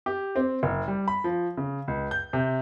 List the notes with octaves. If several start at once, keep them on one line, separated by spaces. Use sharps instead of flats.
G4
C4
F#1
G3
B5
F3
C#3
C#2
G6
C3